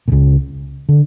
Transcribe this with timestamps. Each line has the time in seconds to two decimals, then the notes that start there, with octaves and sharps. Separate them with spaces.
0.08 A#2
0.12 C#2 C#3
0.89 D3